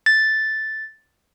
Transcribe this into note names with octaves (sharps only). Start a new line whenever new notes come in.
A6